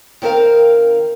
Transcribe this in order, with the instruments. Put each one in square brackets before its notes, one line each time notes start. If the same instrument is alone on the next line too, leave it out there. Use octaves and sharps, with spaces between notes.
[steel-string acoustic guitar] D#3 C4 A#4 F5